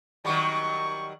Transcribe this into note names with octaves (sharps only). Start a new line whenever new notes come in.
D#3 F#3 G3 C#6